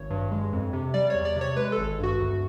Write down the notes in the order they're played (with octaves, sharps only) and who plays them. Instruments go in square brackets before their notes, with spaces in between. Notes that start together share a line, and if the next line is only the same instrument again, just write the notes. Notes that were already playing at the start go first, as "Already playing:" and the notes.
Already playing: [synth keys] G#1 C#5
G2
G#3
F2
C3
G3 D5
E2 C#5
D5
C3
C#5
G#3 B4
A4
G#1
G2 F#4
D2